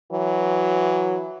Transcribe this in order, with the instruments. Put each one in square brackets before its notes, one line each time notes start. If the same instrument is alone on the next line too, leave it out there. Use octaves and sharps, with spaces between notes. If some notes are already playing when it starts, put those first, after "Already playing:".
[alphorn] E3 [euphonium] F#3